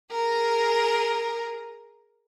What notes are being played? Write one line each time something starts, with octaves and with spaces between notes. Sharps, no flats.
G#4 A#4